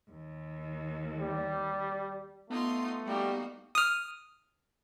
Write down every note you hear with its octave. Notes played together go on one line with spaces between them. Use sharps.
D#2
G3
A3 B3 D#4 F4 C6
G3 A#3 D#4 F#4
D#6 F6